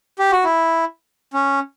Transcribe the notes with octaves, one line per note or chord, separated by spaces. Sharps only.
G4
F#4
E4
C#4